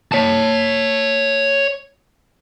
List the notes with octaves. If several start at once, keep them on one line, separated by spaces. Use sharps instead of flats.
C#5 A5